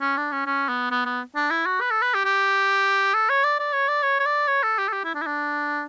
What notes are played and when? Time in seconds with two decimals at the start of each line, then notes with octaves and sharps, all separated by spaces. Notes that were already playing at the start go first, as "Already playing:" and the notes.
0.01 C#4
0.17 D4
0.32 C#4
0.46 C#4
0.69 B3
0.91 B3
1.05 B3
1.35 D4
1.50 E4
1.66 F#4
1.81 B4
1.91 A4
2.02 B4
2.14 G4
2.25 G4
3.14 A4
3.29 C#5
3.44 D5
3.59 D5
3.73 C#5
3.88 D5
4.03 C#5
4.20 C#5
4.26 D5
4.48 C#5
4.63 A4
4.78 G4
4.88 A4
4.93 G4
5.04 E4
5.14 D4
5.22 E4
5.26 D4